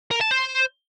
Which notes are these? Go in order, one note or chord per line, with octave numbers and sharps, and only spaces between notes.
A#4
A5
C5